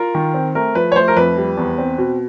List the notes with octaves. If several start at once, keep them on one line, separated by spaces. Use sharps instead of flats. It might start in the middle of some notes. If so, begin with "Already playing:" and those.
Already playing: F4 A#4
D#3
C4
A3 A#4
F3 B4
C#5
A3 C5
A#4
F2 B4
G3
E2
C4
B2